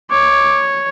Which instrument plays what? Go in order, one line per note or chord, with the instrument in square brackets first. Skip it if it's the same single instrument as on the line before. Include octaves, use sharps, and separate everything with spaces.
[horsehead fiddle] C#5 [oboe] D6